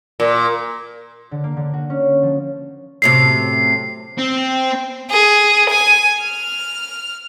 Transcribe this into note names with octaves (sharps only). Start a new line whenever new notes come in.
A#2
D3
A#3
D3
F#4
C#4
F3
F#2 A2 C3 C7
C4
G#4
G#5
F6